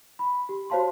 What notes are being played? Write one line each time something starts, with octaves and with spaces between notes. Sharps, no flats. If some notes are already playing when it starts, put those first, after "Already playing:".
B5
G4
F#4 C5 C#5 F5 A5 C6